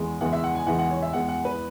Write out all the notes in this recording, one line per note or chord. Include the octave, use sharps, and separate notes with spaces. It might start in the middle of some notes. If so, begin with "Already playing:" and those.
Already playing: E2 E3 G#3
E2 E3 G#3 F#5
E5
F#5
G#5
E2 E3 G#3 F#5
F#5
C#5
E5
E2 E3 G#3 F#5
F#5
B4